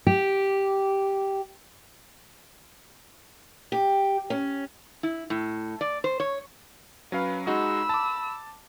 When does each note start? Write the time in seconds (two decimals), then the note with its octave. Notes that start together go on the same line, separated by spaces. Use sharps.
0.07 G4
3.72 G4
4.30 C#4
5.03 E4
5.30 A2
5.81 D5
6.04 C5
6.20 C#5
7.12 F#3 C#4 B4 F5
7.47 G#3 D#4 F#4 B5 E6
7.89 A5 D6